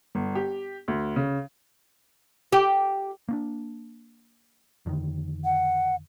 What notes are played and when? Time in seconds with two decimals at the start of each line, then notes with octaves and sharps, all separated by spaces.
0.15 G1
0.35 G4
0.88 D2
1.16 C#3
2.52 G4
3.29 A#3 C#4 D4
4.86 F2 D3 D#3
5.45 F#5